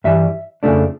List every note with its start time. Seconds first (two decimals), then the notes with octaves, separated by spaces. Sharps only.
0.04 G2 E3 G3 E5
0.63 F2 C#3 F3 A3 D4